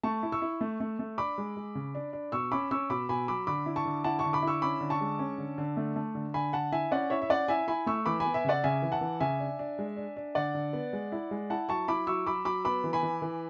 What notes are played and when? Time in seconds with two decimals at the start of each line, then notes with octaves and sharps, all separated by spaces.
0.03 A3 A5 C#6
0.23 E4
0.32 C#6 E6
0.42 E4
0.61 A3
0.80 A3
0.99 A3
1.18 D4 B5 D6
1.38 G#3
1.57 G#3
1.75 C#3
1.95 D4
2.13 D4
2.32 B2 C#6 E6
2.52 C#4 B5 D6
2.71 C#4 C#6 E6
2.90 B2 B5 D6
3.09 B2 G#5 B5
3.28 F#3 B5 D6
3.47 D3 B5 D6
3.66 E4
3.76 A5 C#6
3.85 D3
4.04 E4 F#5 A5
4.19 D3 A5 C#6
4.33 B5 D6
4.42 E4
4.47 C#6 E6
4.62 C#4 B5 D6
4.81 D3
4.90 A5 C#6
5.01 G#3
5.19 C#4
5.38 D3
5.58 D3
5.77 A3
5.96 A3
6.15 D3
6.34 D3 G#5 B5
6.53 D3 F#5 A5
6.72 E4 E5 G#5
6.91 C#4 D5 F#5
7.10 E4 C#5 E5
7.22 E5
7.29 C#4 D5 F#5
7.48 E4 E5 G#5
7.68 E4 G#5 B5
7.86 A3 C#6 E6
8.06 E3 B5 D6
8.20 G#5 B5
8.25 B3
8.34 E5 G#5
8.44 C#3 D5 F#5
8.64 C#3 E5 G#5
8.82 E3
8.92 F#5 A5
9.01 E3
9.20 C#3 E5 G#5
9.40 D4
9.59 D4
9.79 G#3
9.97 D4
10.17 D4
10.35 D3 D5 F#5
10.55 D3
10.73 B3
10.93 G#3
11.12 E4
11.31 G#3
11.50 E4 F#5 A5
11.69 F#3 A5 C#6
11.88 E4 B5 D6
12.07 F#3 C#6 E6
12.26 F#3 B5 D6
12.45 F#3 B5 D6
12.65 B3 B5 D6
12.84 E3
12.93 G#5 B5
13.03 E3
13.22 E3